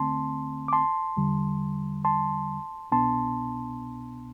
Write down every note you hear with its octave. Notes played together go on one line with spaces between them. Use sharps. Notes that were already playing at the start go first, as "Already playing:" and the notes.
Already playing: D2 D3 A3 C4 A5 C6
D6
A5 C6
E2 D3 G3
A5 C6
C2 B2 B3 D4 A5 C6